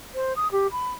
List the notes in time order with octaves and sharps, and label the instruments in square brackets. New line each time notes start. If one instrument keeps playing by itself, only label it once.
[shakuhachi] C5
D#6
G4
B5